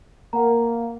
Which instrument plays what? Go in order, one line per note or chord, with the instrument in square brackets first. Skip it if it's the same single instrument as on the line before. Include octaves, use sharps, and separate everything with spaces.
[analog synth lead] A#3 [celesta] A#4 F#5 A#5